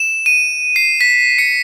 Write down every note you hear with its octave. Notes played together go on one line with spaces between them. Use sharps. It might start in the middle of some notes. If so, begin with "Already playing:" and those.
Already playing: E7
D#7
C7
B6
C#7